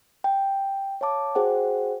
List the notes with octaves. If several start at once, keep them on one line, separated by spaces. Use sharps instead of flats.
G5
C#5 F5 A5 D6
F#4 G#4 C5 F#5 G5